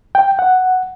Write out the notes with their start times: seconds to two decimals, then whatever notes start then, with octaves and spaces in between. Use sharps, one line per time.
0.15 G5
0.39 F#5